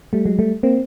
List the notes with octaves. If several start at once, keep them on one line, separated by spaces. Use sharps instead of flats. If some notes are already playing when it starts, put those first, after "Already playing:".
G3 A3
F#3 G#3
G3 A3
A#3 C4